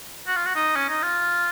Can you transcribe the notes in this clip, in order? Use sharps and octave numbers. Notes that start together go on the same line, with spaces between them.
F#4
F4
F#4
D#4
C#4
D#4
F4